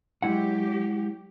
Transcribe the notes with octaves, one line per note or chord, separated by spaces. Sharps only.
F#3 G#3 E4 G4 F#5